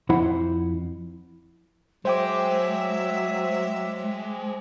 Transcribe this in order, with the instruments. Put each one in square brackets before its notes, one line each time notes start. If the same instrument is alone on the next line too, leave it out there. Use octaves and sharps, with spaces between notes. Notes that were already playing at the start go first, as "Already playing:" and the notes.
[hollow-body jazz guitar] F2 F3 E4 C5 F#5
[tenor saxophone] F#3 [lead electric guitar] G#3 [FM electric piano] C5 G5 D6 [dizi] E5